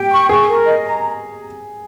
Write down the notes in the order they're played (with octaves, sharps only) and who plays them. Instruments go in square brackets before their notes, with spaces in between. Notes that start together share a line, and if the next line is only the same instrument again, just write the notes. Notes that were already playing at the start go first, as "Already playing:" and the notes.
Already playing: [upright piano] G4 [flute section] G5
[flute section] C#6
[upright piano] G#4 [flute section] C#6
[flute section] A#4
D#5
A#5